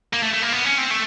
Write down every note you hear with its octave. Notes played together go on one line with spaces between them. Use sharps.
A#3
A3
A3
A#3
B3
C#4
C4
A3